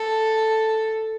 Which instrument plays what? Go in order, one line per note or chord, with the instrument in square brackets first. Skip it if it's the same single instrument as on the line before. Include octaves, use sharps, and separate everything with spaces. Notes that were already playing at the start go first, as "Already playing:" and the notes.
Already playing: [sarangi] A4